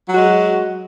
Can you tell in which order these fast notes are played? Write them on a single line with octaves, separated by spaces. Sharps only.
F#3 F#4 G#3